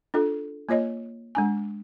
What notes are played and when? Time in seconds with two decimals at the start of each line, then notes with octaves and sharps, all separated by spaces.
0.14 D4 F4 A4
0.69 A#3 F4 C#5 D#5
1.35 G#3 D4 G#5